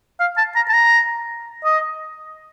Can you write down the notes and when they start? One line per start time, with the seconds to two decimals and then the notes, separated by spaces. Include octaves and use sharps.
0.20 F5
0.38 A5
0.56 A#5
0.69 A5
0.73 A#5
1.65 D#5